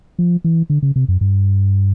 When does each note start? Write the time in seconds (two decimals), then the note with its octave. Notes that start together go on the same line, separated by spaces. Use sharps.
0.19 F3
0.44 E3
0.70 D3
0.82 C#3
0.96 C3
1.08 F#2
1.21 G2